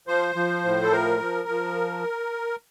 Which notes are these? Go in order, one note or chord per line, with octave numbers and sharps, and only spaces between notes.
F3 C5
F3
A2
A4
F3 A#4
F3
F3